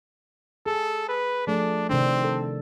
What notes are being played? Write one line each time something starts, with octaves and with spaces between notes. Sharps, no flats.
G#4 A4
B4
F3 A3 D4 G#4
C3 D#3 C4 D4
A4